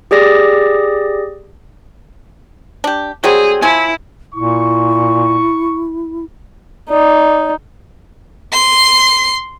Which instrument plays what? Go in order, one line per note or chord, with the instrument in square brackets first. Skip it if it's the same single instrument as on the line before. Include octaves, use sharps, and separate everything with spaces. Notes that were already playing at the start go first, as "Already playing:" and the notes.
[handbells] G4 G#4 D5 A#6
[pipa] D4 G4
[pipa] F#3 G3 C4 [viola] G#4
[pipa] F3 G#5 [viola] E4
[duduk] A#2 [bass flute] E4 [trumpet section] C#6
[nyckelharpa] D#4 [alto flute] D5
[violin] C6 C7